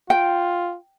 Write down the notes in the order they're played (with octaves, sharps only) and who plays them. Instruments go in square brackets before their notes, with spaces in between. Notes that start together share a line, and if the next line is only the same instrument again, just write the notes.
[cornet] F4 [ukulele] G5